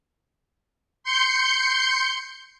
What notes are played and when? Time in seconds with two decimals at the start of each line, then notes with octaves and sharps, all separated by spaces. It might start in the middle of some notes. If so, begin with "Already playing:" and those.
1.04 C6 G6 C#7